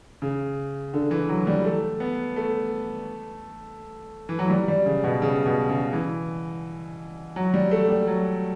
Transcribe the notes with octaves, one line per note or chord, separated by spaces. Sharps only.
C#3
D3
E3
F#3
G3
A3
B3
A3
E3
F#3
G3
G3
C#3
B2
C#3
B2
C#3
E3
F#3
G3
A3
G3
F#3